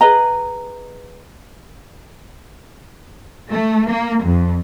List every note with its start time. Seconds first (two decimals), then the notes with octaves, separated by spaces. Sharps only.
0.01 G#4 B4 D#5 A#5
3.50 A3
3.89 A#3
4.23 F2